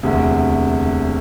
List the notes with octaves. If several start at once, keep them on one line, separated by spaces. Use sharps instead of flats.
E1 D2 C3